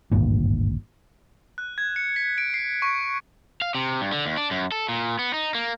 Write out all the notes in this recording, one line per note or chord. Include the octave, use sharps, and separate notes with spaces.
G#1 D2 G2 A#2
F#6
G#6
C#7
B6
D7
C7
C#6
F5
C3
G2
D3
D#2
D4
F#2
A4
A#2
B3
D#4
A#3